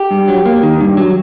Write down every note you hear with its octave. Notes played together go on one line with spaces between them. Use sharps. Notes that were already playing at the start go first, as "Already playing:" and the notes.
Already playing: G4
G2
F#3
A#3
D#3
G2
F#3